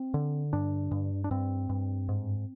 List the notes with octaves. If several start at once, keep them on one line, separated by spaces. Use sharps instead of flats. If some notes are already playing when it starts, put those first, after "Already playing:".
Already playing: C4
D3
G2 D4
G2
D4
G2 C4
G2
G#2